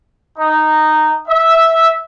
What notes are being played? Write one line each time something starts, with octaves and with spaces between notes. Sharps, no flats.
D#4
E5